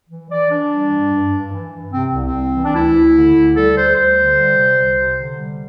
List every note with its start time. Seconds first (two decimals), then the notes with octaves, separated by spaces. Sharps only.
0.09 E3
0.29 E3 D5
0.49 E3 D4
0.70 G3
0.91 G2
1.11 G2
1.32 G2
1.52 E3
1.72 G2
1.92 C3 C4
2.12 C2
2.19 C4
2.33 C2
2.53 E3
2.64 D4
2.73 D2 E4
2.93 D2
3.14 D3
3.34 D2
3.55 G3 A4
3.75 D2 C5
3.95 D2 C5
4.16 D3
4.36 G3
4.56 C3
4.77 C2
4.97 C3
5.17 D3
5.38 G3